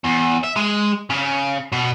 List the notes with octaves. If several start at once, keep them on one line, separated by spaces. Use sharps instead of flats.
E2
E5
G#3
C#3
B2